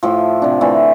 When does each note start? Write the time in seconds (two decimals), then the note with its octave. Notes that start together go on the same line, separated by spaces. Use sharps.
0.03 A2 F3
0.42 C3 D4
0.61 D3 E3 A3